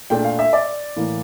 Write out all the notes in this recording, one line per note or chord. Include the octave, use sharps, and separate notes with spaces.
A#2 A3 D4 G5
F5
E5
D5
A2 E3 A#3